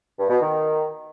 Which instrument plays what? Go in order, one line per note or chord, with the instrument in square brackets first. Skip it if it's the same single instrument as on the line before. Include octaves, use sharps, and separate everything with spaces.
[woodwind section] G2
B2
D#3